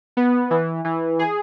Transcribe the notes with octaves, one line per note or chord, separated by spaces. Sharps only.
B3
E3
E3
G#4